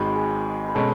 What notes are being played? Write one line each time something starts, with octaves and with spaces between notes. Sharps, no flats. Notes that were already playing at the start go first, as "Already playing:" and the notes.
Already playing: G#1 G#2 G#3 F#4 B4 C#5
G#4
B4
B2 G#3 C#4 A4